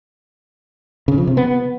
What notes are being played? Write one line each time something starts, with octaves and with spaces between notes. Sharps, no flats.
C#3
F3
C3
B3